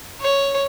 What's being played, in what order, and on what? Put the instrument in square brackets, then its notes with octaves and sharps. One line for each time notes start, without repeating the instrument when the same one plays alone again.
[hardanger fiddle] C#5